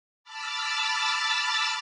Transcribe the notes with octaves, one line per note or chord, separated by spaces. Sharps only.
A5 B5 D6 E6 F6 A6